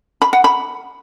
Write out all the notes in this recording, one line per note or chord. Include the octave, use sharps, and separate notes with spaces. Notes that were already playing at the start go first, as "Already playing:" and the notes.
B5
F#5
B5